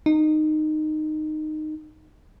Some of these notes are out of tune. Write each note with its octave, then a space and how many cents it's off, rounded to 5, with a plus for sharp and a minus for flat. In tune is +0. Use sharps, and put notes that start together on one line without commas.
D#4 -15